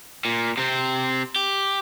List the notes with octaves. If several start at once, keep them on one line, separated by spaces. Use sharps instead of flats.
A#2
C3 C4
G4